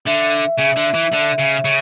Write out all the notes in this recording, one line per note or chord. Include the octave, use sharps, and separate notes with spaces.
D3 E5
C#3
D3
E3
D3
C#3
C#3